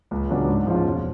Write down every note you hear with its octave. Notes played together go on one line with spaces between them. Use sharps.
C#2
C#3 F#3 B3 D4
G#2
F3 G#3 C#4 F4
E1